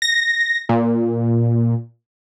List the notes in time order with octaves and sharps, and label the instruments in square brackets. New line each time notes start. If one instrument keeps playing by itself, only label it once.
[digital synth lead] A#6
A#2